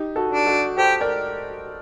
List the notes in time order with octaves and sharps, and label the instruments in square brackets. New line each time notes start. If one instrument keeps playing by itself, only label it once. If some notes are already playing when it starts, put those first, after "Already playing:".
Already playing: [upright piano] D#4 G4
F#4 A4
[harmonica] D4
[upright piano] F#4 A4
[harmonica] G4 [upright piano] A4 C5
[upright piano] A#4 D5